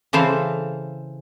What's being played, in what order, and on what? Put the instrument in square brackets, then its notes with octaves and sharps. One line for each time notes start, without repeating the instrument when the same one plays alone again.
[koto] C#3 E3 A4 C5 F5